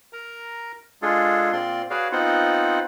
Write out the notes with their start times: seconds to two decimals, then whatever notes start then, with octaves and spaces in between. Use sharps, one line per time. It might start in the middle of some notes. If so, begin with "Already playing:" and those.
0.13 A#4 A#5
1.02 G#3 D4 F4 G#4 A4
1.52 A#2 C4 F4 D5 C6
1.90 F#4 G#4 B4 C#5 D5 F5
2.12 B3 C4 D#4 F4 C5 F#5